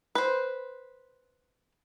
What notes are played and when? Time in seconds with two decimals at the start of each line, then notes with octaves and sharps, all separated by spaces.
0.15 B4 C5